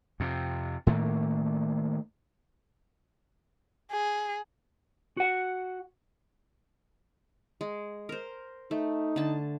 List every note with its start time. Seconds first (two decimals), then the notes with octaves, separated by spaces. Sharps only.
0.20 F2 C3
0.87 A2 D#3 A3 A#3
3.92 G#4
5.17 F#4 F#5
7.61 G#3
8.09 A#4 C5
8.71 A3 D#4
9.16 D3 A5